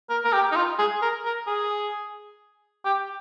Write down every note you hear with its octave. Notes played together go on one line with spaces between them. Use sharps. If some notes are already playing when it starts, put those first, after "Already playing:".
A#4
A#4
G4
D#4
F4
G#4
A#4
A#4
G#4
G4